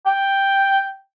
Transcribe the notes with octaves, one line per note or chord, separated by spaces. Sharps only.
G5